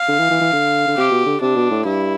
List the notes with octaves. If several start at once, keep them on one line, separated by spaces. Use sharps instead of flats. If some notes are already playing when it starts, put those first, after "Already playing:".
Already playing: F5
D3
E3
E3
E3
D3
D3
C3 G4
B2
D3
C3 D4
B2
A2
G2 E4